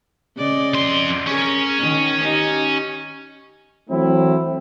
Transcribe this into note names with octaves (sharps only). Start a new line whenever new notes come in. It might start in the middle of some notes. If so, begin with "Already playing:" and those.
C#3 D5 D#5
F2 C6
C#4 G#4 A#4
D#3
D#4 G4
E3 F#3 A3 C4 E4